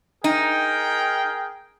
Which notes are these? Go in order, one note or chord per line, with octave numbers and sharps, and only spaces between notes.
D#4 G#4 A#4 G5